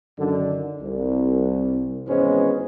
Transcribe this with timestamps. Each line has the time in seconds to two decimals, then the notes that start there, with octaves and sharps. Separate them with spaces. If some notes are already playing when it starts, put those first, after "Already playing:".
0.19 F#2 D3 D#3
0.82 C2
2.07 G#1 E3 G#3 B3 C#4 C5